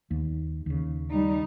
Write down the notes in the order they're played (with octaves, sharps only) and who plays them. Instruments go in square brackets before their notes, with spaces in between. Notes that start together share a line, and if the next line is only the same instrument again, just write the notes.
[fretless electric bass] D#2
D#2 C#3
[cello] G3 D#4